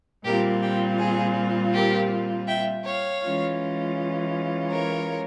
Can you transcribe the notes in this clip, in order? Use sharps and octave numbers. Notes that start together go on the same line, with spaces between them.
A#2 G3 C4 F4 G4 A#4
G4
G#4
G4 A#4
E5 G5
C#5 F5
E3 G#3 C#4 F4
A#4 C#5